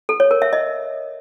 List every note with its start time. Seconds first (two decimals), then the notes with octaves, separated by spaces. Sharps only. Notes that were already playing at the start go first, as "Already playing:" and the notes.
0.09 A4
0.20 C#5
0.31 A#4
0.42 E5
0.53 D#5